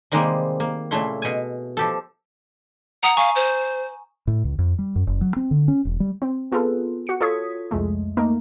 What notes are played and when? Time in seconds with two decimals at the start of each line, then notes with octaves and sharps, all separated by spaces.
0.12 C3 D#3 G3 G#3 A#3 C4
0.60 A#3
0.91 A#2 C#3 A3 E4 C6
1.22 B2 G#5
1.77 F3 G4 A4
3.03 F#5 A#5 D#6
3.17 F5 G#5 C#6
3.35 C5
4.27 A2
4.44 C#2
4.59 F2
4.79 G3
4.96 F#2
5.07 F#1
5.21 F#3
5.36 C4
5.51 D3
5.68 C#4
5.85 E1
6.00 G3
6.22 C4
6.52 B3 F4 G#4 A4 B4
7.07 F#4 C#7
7.21 F4 A4 C#5 D#6 G#6 B6
7.71 C2 F2 G#3 A3
8.17 A3 A#3 D#4 A#4